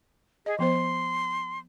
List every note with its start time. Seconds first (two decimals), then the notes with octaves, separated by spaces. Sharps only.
0.46 G#4 D#5
0.59 F3 B3 C5 C6